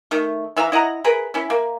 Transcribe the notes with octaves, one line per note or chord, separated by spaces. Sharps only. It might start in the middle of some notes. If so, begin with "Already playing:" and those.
D#3 A3
E3 E5 F5 A#5
E4 D#5 F#5 A#5
G#4 A#4 B4
C#4 E4
A#3